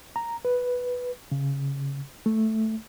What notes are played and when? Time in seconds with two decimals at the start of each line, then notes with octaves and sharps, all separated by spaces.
0.16 A#5
0.45 B4
1.32 C#3
2.26 A3